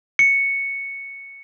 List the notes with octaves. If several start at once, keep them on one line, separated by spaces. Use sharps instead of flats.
C#7